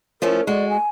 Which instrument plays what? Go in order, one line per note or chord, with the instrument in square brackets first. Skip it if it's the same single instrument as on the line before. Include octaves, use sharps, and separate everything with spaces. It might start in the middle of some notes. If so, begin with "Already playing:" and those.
[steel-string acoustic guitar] F3 A3 C#4 [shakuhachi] A#4
[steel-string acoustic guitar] G#3 F#4 [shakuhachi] D5
[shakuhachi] G#5